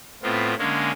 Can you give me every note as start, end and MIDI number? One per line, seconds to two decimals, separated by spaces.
0.23 0.54 45
0.23 0.54 59
0.23 0.54 60
0.23 0.54 65
0.58 0.92 50
0.58 0.92 56
0.58 0.92 58
0.58 0.92 61